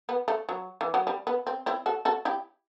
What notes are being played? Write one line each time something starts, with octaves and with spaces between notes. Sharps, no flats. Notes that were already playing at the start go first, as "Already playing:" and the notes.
B3
A3
F#3
E3
F#3
G3
B3
C4
C4 E4
F#4 A4
F#4 A4
E4 G4